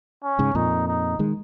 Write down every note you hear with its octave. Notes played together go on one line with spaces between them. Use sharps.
C#4
G#2 C#3
F2 A#2 D#4
D#4
D#3 G#3